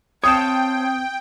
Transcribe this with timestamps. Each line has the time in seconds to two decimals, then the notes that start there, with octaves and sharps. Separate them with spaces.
0.24 C4 C#5 F5 G5 A5 D#6